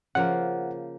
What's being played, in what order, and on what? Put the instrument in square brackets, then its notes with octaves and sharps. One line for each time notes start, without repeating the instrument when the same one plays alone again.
[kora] C#3 F3 A#3 [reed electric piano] F#5